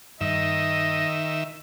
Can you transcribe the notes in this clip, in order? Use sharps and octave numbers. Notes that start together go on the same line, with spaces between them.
G2 D#3 D#5 E5